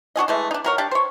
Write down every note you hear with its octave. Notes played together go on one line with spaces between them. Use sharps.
D4 F#4 G#4 D#5
E3 G#3 A3
D4 D#4
F#3 A#4 C#5
D4 G4 A5
C5 C#5